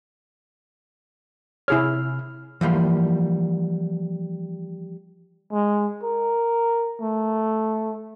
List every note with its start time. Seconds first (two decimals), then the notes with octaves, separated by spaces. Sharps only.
1.68 C3 E4 G#4 C#5 F6
2.61 E3 F3 G3 A#3
5.52 G#3
6.03 A#4
7.01 A3